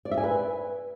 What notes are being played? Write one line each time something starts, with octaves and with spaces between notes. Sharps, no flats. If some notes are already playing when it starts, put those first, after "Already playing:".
D5
E5
G#5
B4